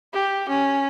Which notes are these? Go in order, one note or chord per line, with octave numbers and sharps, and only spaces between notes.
G4
C#4